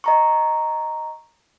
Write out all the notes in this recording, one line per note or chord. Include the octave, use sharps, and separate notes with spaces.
D#5 A#5 C#6